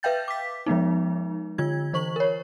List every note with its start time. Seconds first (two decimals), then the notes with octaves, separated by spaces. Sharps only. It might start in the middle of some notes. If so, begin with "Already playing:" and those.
0.03 B4 E5 F5 G5 G6 A6
0.28 D6 B6
0.66 F3 G#3 B3 D#4
1.58 D3 F4 G#6
1.93 E3 C5 C#6 F#7
2.16 A#4 C#5